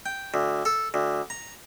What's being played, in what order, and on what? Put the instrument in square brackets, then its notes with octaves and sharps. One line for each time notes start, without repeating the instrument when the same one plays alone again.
[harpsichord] G5
D2
A4
D2
A#5